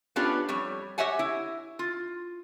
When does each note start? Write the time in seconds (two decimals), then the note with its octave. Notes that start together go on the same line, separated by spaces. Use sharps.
0.16 B3 C#4 D4 F4 G4 B4
0.49 F2 G3 C#5
0.98 G4 C#5 D#5 E5 F#5 G#5
1.19 E4
1.79 F4